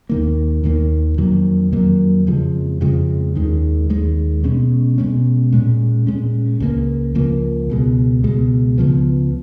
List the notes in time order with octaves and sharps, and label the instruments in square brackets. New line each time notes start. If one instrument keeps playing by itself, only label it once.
[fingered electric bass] D#2 D#3 A#3
D#2 D#3 A#3
F2 D#3 F#3 A#3
F2 D#3 F#3 A#3
F2 C#3 F3 G#3
F2 C#3 F3 G#3
D#2 D#3 G#3
D#2 D#3 G#3
B2 G#3 C#4
B2 G#3 C#4
A#2 G#3 C#4
A#2 G#3 C#4
C#2 C#3 F3 A#3
C#2 C#3 F3 A#3
C#2 B2 G#3
C#2 B2 G#3
C#2 C#3 F3 B3